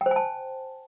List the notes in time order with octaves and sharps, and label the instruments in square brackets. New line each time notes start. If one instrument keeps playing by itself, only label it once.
[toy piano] G5
C5
G#5
A5